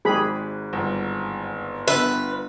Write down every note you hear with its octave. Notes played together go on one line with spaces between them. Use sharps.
G#1 G#2 G4 G#4 B5
G1
D3 B3 B4 E5